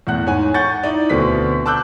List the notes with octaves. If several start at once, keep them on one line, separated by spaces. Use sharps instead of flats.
E2 A2 F#5 F#6
G#2 C#5 G#5
F#5 C#6 G6 A6
D#4 E4 D5
D2 B2 C4 B6
A5 D6 E6 F#6 G6